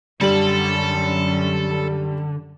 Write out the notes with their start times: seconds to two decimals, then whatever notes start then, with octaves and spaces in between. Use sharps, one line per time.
0.21 F#2 D3 G3 C#4 A4 F#7